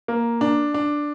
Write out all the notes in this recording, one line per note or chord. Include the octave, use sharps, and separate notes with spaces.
A#3
D4
D4